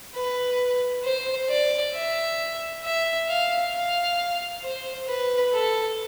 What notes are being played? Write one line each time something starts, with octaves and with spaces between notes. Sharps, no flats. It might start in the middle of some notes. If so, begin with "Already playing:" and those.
B4
C5
D5
E5
E5
F5
F5
C5
B4
A4